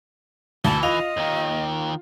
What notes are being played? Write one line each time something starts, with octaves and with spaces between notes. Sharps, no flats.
D2 E3 A5
F4 D#5 F7
D#2 D#3